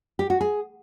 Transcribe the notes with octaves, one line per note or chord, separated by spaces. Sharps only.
G4
F#4
G#4